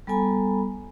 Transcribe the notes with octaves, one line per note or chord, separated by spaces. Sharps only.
G3 B3 A4 G#5 A#5 B5